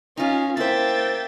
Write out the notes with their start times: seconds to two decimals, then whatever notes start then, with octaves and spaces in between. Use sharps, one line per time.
0.17 C#4 D#4 F4 F5
0.57 A#3 E4 C5 E5 G5 A6